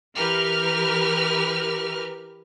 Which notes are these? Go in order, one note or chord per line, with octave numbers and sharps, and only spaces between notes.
E3 G4 A#4 B4 F6